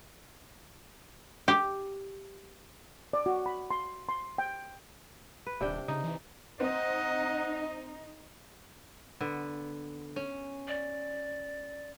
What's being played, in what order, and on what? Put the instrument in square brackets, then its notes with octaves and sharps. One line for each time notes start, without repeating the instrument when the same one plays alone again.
[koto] G4
[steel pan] D5
F#4
B5
C6
C6
G5
[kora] B4
[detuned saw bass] D#1 [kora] C3 D4 G5
[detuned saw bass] C#3 [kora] D#4
[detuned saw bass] E3
[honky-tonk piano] C4 [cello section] D#4 [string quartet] D#5 [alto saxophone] F#5
[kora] D3 B3
C#4
[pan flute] D5